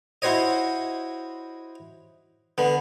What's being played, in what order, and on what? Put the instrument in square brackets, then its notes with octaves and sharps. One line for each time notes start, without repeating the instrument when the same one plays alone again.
[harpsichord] E4 F#4 C5 C#5 D#5
D3 B3